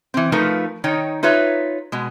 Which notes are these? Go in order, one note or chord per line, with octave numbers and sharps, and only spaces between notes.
E3 C4
F3 A3 D#4 F4 A#4 B4
D#3 D#4 C#5 G5
D#4 F4 B4 C#5 E5
B2 G#3